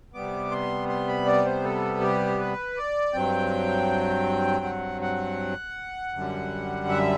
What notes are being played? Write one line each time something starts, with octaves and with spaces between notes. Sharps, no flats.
C3 G3 B3 D6
C6
C6
B5
D5
C5
A4
G4
B4
D5
G2 F#3 C4 G5
F#5
F#5
F#2 D3 G3
E5